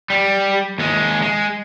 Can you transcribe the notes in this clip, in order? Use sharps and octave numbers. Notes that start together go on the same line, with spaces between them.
G3
D#2 G#3
G#3